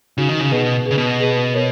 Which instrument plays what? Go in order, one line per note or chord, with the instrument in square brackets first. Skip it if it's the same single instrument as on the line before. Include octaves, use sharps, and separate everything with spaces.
[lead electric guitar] C#3 [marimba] D#4 F#4
[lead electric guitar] D#3
C#3
[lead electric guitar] B2 [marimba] G#4 B4
[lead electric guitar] C#3 [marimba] G#4 B4
[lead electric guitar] B2
[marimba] G#4 B4
A#4 C#5